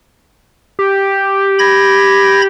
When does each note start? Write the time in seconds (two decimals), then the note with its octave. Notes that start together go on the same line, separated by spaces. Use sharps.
0.79 G4
1.59 B5 G#6 A#6